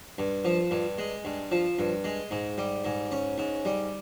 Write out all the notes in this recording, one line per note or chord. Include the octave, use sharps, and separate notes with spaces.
G2
F3
G2
G#3
G2
F3
G2
G#3
G#2
G3
G#2
C#4
G#2
G3